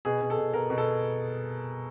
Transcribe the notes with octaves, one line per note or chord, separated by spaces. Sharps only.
B2 G#4
B2
A4
B2
B2 A#4
B2
A4